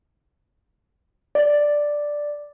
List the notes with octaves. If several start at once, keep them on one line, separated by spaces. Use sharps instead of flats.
D5